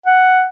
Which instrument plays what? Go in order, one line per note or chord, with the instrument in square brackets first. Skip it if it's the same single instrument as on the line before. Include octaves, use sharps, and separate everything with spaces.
[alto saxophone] F#5